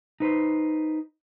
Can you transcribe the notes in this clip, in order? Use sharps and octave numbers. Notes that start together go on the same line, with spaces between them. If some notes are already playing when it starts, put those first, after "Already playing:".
D#4 B4 C5